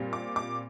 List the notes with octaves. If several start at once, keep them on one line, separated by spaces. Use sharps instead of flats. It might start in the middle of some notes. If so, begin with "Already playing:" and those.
Already playing: A#2 G3 C4
D6
D6